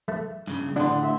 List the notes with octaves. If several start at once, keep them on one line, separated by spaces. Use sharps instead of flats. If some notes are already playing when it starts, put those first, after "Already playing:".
A3
G2 C#3
A2 D3 D4 F#5 C6
E5